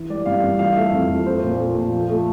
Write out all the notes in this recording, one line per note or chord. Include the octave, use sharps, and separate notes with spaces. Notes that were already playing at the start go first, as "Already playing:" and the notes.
Already playing: E3
G3 D5
G2 F5
G2
E3 F5
A3 E5
F2
F2
A3 C5
A#2
A3
A#2
F3
A3